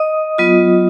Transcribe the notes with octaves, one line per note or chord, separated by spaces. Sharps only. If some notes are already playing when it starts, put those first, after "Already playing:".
Already playing: D#5 D#6
F#3 B3 F4